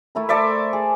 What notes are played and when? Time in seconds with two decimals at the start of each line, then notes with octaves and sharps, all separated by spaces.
0.15 A3 E4 A#4
0.29 A4 C5 D5 E5
0.73 G#4